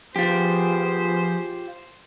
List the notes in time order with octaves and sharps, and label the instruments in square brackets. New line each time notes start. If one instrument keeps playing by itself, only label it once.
[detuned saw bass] F3 [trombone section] B3 G#4 [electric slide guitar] F4 G4 [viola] C5